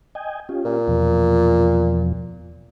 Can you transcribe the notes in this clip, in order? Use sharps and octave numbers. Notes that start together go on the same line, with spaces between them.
D#5 G5 G#5
C#4 F4 G4
A#2
E2 B2 F3